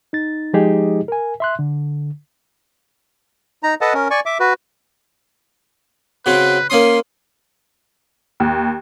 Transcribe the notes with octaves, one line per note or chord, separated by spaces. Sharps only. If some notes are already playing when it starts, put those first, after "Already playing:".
D#4 A6
F3 G#3 D#4 G4 G#4 D#5
A#4 G#5
E5 C6 F#6
D3
D#4 A#5
A4 B4 D#5 F#5 A5
C#4 A#4
D5 G#5 C#6
E5 D6
F#4 B4
C#3 F#3 C4 B4
A#3 C#4 C6 D#6
D#2